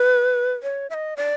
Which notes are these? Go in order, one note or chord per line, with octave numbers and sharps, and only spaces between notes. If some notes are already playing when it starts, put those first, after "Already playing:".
Already playing: B4
C#5
E5
D#5
D5